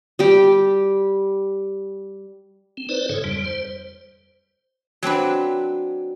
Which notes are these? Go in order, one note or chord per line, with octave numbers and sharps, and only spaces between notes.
G3 G4
C4
D#4 B4 C5 D5
G#2 C#3 A4 C#5
F2 G3
C5
F#3 C4 D4 B4